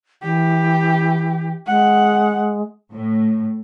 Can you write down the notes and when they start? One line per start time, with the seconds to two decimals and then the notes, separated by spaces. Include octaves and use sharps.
0.23 E3 G4
1.67 G#3 F#5
2.93 A2